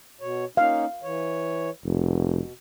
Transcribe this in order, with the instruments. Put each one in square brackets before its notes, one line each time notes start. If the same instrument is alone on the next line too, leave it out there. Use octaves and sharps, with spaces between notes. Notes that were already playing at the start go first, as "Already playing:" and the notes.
[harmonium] B2 C#5
[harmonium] A#3 C#4 D#4 [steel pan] F5
[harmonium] E3 C#5
[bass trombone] F1 [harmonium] B2